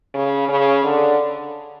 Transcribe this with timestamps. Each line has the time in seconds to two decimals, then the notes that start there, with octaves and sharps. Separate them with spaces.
0.14 C#3
0.49 C#3
0.84 D3